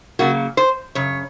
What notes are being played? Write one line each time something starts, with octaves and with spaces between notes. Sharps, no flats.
C#3 F#3 A#3 F#4
C5
F#2 C#3 C#5